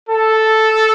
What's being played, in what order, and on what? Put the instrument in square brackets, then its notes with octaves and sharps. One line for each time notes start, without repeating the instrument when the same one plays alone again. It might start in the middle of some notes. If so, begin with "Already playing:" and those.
[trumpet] A4